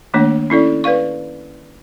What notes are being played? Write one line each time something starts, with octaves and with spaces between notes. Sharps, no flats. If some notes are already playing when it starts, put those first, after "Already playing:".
D#3 A3 A#3 D4 C#5
C#4 E4 A4 D5
B4 D5 F5 C#6